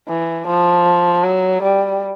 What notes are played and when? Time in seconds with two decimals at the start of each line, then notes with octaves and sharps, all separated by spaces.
0.08 E3
0.47 F3
1.24 F#3
1.62 G3